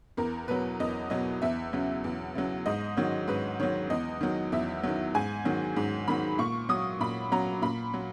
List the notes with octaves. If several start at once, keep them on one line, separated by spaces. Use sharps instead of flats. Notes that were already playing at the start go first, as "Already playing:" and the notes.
E2 A#4
B2 F#3 B4
E2 D#5
B2 F#3 D#5
E2 E5
C#3 F#3
E2
C#3 F#3
G#2 D#5
D#3 F#3 C#5
G#2 B4
D#3 F#3 C#5
E2 D#5
D#3 F#3
E2 E5
D#3 F#3
G#2 G#5
D#3 F#3
G#2
D#3 F#3 B5
A#2 C#6
F#3 D#6
A#2 B5
F#3 A#5
A#2 B5
F#3